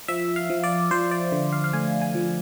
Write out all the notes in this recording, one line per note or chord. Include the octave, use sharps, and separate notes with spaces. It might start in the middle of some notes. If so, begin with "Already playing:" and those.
F3 E5
F5
F3
D5
F3 C5
D5
D3 C5
F5
F5
A3 G#5
G#5
F3